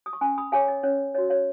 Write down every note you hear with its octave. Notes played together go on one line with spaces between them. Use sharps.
D#6
C#6
C#4 G#5 B5
B5 D#6
G#4 C#5 F5 G#5
D#5
C#4 C#5
F#4 C#5 D#5
C#5 F5